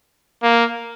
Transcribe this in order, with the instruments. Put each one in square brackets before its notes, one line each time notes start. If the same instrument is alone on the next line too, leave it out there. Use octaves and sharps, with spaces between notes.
[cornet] A#3